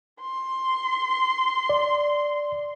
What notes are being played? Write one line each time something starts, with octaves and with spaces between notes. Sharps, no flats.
C6
D5